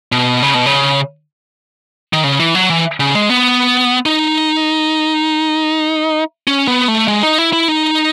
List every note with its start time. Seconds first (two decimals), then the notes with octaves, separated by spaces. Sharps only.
0.12 B2
0.42 C#3
0.54 B2
0.66 C#3
2.13 D#3
2.24 C#3
2.39 E3
2.55 F#3
2.70 E3
3.00 C#3
3.15 G#3
3.29 B3
4.06 D#4
6.47 C#4
6.67 B3
6.88 A3
7.08 G#3
7.23 D#4
7.38 E4
7.53 E4
7.68 D#4